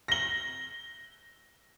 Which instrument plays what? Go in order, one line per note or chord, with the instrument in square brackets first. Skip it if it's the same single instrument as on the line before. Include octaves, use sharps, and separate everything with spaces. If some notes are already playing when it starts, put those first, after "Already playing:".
[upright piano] A#6 G7